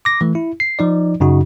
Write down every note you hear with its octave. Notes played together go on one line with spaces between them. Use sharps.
D6 A#6
E3 A3
E4
C7
F3 D#4 D5
F#2 C#3 D#4 F#4